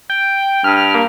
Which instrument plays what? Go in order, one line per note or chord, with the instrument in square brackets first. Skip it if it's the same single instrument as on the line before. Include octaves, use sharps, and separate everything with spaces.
[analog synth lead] G5
[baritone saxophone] G2 [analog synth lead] F6
[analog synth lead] A#3